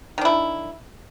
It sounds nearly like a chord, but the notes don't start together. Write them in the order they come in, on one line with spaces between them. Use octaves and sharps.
D#3 D4 E4